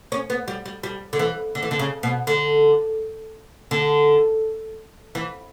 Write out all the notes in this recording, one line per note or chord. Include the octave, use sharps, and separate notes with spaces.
C#4
B3
G3
G3
G3
D3
E3
D3
E3
D3
C#3
B2
D3
D3
E3